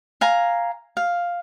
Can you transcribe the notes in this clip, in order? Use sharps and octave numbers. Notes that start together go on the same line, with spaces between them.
F5 G#5 A#5
F5